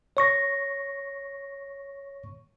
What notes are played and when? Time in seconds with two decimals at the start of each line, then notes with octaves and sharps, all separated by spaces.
0.17 C#5 C#6 A#6